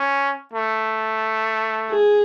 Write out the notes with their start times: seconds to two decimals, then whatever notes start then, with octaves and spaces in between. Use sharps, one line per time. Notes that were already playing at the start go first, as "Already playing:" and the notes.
Already playing: C#4
0.53 A3
1.91 G#4